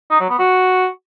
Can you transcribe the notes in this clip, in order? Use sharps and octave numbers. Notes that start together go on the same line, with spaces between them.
D#4
F#3
B3
F#4